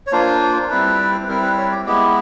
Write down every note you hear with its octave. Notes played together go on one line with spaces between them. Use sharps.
C#5
A#3 D4 F4 C5
G3 C4 E4 B4
B4
G3 C4 E4 A#4
B4
C#5
G4
G#3 B3 E4 G4